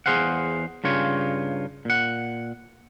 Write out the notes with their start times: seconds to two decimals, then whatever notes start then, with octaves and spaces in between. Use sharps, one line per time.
0.06 E2 G#4 C5 F5 F#5
0.84 G2 C#3 F4 C#5
1.85 A#2 F#5